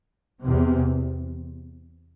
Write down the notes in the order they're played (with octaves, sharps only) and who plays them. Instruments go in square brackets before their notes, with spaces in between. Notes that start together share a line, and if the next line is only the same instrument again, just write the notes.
[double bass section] E2 C3